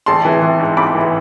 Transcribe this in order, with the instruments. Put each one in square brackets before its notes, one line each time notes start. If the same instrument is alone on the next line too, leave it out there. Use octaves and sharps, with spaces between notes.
[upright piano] A1 A5 C6
E3
E3
G#2
A1 B5 D6
E3